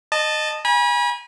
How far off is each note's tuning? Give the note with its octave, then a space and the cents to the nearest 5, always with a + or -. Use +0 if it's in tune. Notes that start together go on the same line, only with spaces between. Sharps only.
D#5 -20 A5 +0
G#5 -20 B5 -40